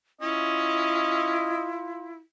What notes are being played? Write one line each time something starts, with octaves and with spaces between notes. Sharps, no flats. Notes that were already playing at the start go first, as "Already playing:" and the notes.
C#4 E4 F4 D#5